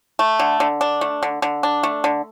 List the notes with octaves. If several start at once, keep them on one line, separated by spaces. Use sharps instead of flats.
A3
D3
D3
D4
A3
D3
D3
D4
A3
D3